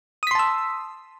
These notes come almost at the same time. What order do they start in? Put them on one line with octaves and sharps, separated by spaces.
D#6 B6 C6 A5 E6